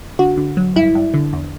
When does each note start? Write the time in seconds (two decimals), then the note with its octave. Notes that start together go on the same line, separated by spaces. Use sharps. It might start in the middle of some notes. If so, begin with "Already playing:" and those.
0.19 D3 F#4
0.37 D3
0.57 F#3
0.76 G2 E4
0.95 G2
1.14 D3
1.33 E2